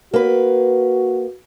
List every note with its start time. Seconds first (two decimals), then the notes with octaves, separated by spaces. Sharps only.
0.14 A#3 F#4 B4